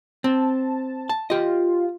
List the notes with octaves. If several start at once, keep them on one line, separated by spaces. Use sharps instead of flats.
C4 A5
A5
F4 G4 D#5